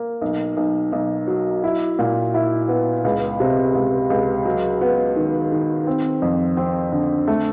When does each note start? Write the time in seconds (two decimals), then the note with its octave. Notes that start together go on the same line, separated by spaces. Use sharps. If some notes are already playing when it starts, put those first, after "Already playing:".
Already playing: A#3
0.21 B1
0.57 B1
0.92 B1
1.28 F#3
1.64 E4
1.99 A#2
2.34 E4
2.68 B3
3.04 C#2
3.40 C3
3.75 C#2
4.10 C#2
4.45 F#3
4.81 B3
5.16 D#3
5.52 D#3
5.87 C4
6.22 F2
6.57 C4
6.92 D3
7.28 A3